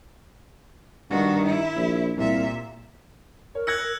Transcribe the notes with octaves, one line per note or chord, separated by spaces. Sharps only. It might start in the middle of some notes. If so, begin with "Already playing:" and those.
G2 D#3 F#4
E4
A#1
C2 A#2 E5
A#4 C#5
E6 F#6 G#6 A#6 C#7 F#7
A#4